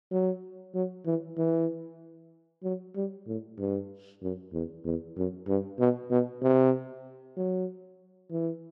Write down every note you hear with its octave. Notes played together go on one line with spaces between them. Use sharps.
F#3
F#3
E3
E3
F#3
G3
A2
G2
F#2
E2
E2
F#2
G2
B2
B2
C3
F#3
E3